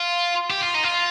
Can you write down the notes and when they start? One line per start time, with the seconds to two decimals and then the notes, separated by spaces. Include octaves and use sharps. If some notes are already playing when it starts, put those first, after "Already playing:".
Already playing: F4
0.51 G4
0.61 F4
0.75 D#4
0.84 F4